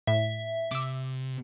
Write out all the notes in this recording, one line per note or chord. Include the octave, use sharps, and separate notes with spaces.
A2 E5
C3 D6 E6